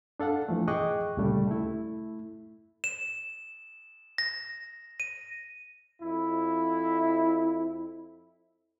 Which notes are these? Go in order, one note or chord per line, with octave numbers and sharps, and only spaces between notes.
D4 A4 F5 F#5
E3 F3 A3
G#4 D#5 G5 C#6 D6 F#6
D2 A#2 C#3 G3 A3
A3 E4
E7
A#6
D#7
F2 E4